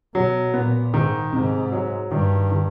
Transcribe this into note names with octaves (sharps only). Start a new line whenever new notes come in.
B2 F#3
A#2 B3
G#2 D#3
G#2 C3
F#3
G2 D#3
D#3